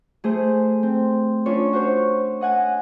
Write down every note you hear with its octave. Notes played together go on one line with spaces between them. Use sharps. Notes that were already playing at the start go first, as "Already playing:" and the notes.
A3 G#4 C5
C4
C#4 D4 F4 C#5
F#4 C5 C#5
D#5 F#5 G#5